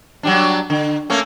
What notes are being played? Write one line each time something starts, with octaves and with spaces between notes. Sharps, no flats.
F#3 G3 D4
D3
A3 A#3 C#4